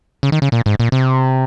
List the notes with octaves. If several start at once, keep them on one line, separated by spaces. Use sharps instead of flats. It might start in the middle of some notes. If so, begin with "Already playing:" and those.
C#3
D#3
C#3
A#2
G#2
A#2
C3